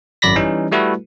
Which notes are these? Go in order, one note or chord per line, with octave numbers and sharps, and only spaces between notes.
G#1 F#2 D5 B5 A#6 B6
E3 G3 C#4 D#4
G3 A3 E4 F#4 A4 B4